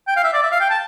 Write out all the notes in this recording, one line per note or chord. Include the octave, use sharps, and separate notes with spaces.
G5
F5
E5
D5
E5
F5
G5
A5